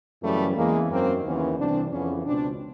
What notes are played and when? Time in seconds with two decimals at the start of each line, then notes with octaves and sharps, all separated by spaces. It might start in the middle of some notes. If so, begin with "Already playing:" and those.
0.23 F#2 C#3 E3 G3 A3
0.56 E2 C#3 E3 G#3 A#3
0.90 F#2 D#3 A#3 C4
1.24 D#2 C#3 E3 B3 C#4
1.58 C2 C3 E3 C4 D4
1.92 F2 C#3 E3 B3 C#4
2.26 C#2 B2 C4 D4